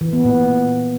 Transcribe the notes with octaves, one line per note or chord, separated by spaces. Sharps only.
E3
B3
A#2